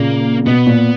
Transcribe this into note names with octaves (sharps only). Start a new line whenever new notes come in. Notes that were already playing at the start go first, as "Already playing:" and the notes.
Already playing: A#2 C#3 A#3
B2 B3
A#2